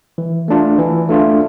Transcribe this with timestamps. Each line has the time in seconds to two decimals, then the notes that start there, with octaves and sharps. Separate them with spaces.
0.18 E3
0.48 A3 D4 F4
0.79 E3
1.09 A3 D4 F4